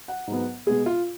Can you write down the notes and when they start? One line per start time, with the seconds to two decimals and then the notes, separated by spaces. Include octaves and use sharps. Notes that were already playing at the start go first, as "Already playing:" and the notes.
0.08 F#5
0.27 G#2 F#3 B3
0.66 B2 G#3 B3 G#4
0.86 F4